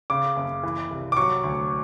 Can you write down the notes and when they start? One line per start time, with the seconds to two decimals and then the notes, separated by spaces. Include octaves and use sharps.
0.10 C#3 D6
0.36 F#1
0.63 E3
0.91 C2
1.12 D6
1.17 F#3 C#6
1.44 D2